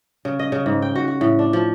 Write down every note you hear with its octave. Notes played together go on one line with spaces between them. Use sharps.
C#3
D#5
C#3
G#2
G5
F#4
F#4
A2
D4
F3